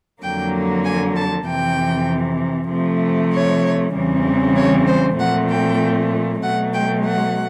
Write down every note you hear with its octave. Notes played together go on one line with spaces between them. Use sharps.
F2 D3 F#3 A#3 G5
G#5
A5
F2 C3 E3 G5
C3 F3 A3
C#5
E2 C#3 E3 G3 C4
C#5
C5
A#2 F3 A3 C4 F#5
G5
B2 F#3 A3 F#5
G5
F#5